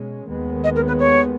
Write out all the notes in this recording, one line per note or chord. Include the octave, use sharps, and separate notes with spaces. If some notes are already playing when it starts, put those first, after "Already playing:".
Already playing: B2 G#3 C#4
D#2 D#3 G#3 B3
D#5
A#4
B4
C#5